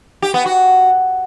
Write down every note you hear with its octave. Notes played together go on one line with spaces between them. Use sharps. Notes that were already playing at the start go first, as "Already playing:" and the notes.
G4
B3
F#4